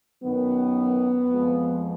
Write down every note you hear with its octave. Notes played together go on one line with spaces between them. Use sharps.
F#2 D#3 F#3 B3
F2 F3 G#3